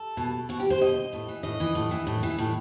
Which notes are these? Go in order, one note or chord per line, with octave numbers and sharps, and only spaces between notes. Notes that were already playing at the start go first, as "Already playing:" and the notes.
Already playing: A4
B2
B2 F#4
G4
C5
B2 D#5
A2
E3
A2 D#5
E3
A2
E3
A2
E3
A2